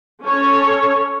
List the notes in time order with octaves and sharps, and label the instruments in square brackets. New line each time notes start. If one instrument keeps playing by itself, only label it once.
[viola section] C#4 A4 C#5